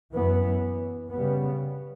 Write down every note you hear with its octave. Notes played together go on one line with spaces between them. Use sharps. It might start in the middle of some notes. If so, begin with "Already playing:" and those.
F#2 E3 B3
C#3 G3 B3